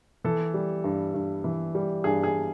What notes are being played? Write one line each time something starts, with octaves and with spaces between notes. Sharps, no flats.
E3 A4
G3
G2
G2
E3
G3
G2 G#4
G#4